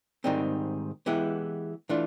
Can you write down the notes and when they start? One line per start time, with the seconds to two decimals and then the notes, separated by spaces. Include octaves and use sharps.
0.24 G#2 D#3 G3 C4 D#4
1.06 E3 G#3 B3 E4 G4
1.89 E3 A3 D4 F4